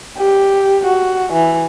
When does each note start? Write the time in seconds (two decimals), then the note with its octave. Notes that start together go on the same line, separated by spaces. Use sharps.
0.18 G4
0.86 F#4
1.33 E3